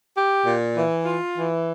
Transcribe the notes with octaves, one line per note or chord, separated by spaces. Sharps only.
G4
A#2
E3
F4
E3